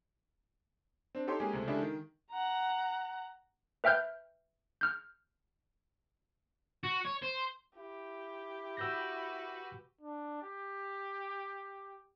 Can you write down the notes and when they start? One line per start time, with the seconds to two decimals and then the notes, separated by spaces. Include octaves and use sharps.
1.15 C4 D4
1.27 D#4 G4 A4 C#5 G5 C6
1.40 G#3 A#3 C#4 G4 G#4 G#5
1.53 C#2 C3 A3
1.67 C#3 G#3 D4 E4 G4 A4
1.82 D#3
2.31 F#5 A#5
3.84 B4 E5 G5 F6 G6
4.81 F6 G6
6.84 F#4
7.05 C#5
7.23 C5
7.77 E4 G4
8.77 F#4 B4 E6 G6 A#6
10.01 D4
10.42 G4